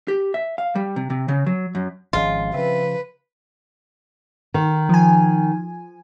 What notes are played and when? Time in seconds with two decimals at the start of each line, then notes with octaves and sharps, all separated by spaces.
0.08 G4
0.34 E5
0.58 F5
0.75 G3
0.96 C3
1.10 C3
1.28 C#3
1.46 F#3
1.75 F#2
2.13 G#1 C#3 F3 G#3 F4 F5
2.54 C#3 F3 C4 B4 E5
4.54 D#3
4.89 F3 G#5